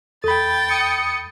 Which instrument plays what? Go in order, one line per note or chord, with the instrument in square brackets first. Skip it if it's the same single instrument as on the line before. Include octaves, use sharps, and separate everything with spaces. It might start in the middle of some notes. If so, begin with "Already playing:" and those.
[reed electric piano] E2 B5 [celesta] A4 [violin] G5 A6
[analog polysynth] D#6 C#7